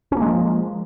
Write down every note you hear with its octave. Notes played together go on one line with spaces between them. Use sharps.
F3 G#3 A#3 C#4